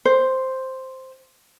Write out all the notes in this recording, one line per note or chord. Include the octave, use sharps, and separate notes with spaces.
C5